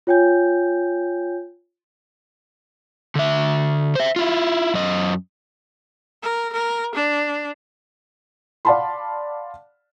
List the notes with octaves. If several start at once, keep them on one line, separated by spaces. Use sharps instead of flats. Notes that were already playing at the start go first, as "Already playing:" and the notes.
F4 C#5 G5 G#5 G6
D3 E5
C5 E5
E4 F4
F#2 D#5
A#4
A#4
D4
D5 F5 F#5 A5 B5 C6